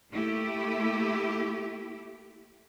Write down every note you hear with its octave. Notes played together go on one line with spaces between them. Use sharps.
A3 A#3 E4 G4